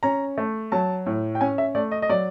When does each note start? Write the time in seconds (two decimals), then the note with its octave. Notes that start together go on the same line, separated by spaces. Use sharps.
0.03 C#4 A#5
0.38 A3
0.72 F#3 A5
1.06 A2
1.35 G5
1.41 C#4 G#5
1.58 E5
1.75 A3 D5
1.91 D#5
2.02 D#5
2.09 F#3 D5